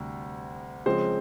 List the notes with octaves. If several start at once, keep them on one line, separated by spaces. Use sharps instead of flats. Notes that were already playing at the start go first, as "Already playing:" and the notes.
Already playing: D2 C3 G3
C#3 F3 G#3 C4 C5